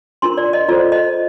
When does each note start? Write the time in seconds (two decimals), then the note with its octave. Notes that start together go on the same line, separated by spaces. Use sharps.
0.22 D4 F4 A#4 C6
0.37 D5
0.53 D#5
0.69 F4 A4 C5 D5
0.92 D#5